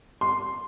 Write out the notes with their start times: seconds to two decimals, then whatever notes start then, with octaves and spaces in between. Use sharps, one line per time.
0.21 C6